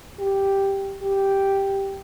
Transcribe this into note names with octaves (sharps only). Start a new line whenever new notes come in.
G4
G4